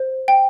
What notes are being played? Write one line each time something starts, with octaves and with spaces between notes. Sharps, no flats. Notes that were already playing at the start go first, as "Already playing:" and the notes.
Already playing: C5
G5